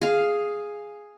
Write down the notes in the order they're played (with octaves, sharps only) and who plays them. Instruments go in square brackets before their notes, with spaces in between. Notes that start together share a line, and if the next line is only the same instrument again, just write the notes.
[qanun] G#4 F5